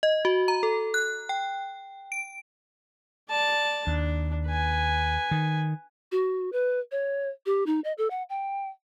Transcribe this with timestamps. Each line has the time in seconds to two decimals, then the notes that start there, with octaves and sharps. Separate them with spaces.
0.03 D#5
0.25 F#4
0.48 A#5
0.63 A4
0.94 F#6
1.29 G5
2.12 D7
3.29 D5 A5
3.87 D#2 D4
4.48 B4 G#5
5.31 D#3
6.12 F#4
6.52 B4
6.92 C#5
7.46 G4
7.67 D#4
7.84 D#5
7.98 A4
8.10 F#5
8.29 G5